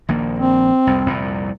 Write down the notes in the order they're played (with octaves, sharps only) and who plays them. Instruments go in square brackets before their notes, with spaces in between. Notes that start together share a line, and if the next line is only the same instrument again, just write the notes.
[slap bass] A#1 D#3 A#3
[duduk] C4
[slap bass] C2 F2
C2 F2 A#2